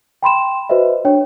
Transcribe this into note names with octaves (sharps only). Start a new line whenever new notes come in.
G5 B5 C6 E7
F#4 B4 C5 D#5 E5
D4 C#5 G5